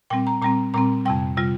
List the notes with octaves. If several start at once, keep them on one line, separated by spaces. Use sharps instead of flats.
A#2 G3 C4 G5
A#5
A#2 G3 C4 A#5
A#2 G3 C4 A#5
F2 C3 G3 G5
C3 G3 F4